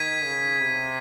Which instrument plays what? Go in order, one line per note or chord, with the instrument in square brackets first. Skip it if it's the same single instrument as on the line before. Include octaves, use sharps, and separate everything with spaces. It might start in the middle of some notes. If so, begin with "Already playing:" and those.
Already playing: [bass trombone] D#3 [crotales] G#6 B6 D#7
[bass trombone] C#3
C3